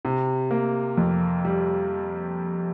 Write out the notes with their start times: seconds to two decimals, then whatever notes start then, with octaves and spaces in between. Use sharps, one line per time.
0.05 C3
0.51 A#3
0.98 F2
1.45 G3